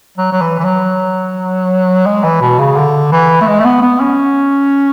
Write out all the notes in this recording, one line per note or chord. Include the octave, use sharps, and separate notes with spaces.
F#3
F#3
E3
E3
F#3
G#3
E3
B2
C#3
D3
E3
A3
G#3
A3
B3
B3
C#4